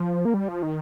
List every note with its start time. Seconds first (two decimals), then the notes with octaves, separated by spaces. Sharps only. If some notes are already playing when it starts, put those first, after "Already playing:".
Already playing: F3
0.25 A#3
0.34 G3
0.48 F3
0.62 D#3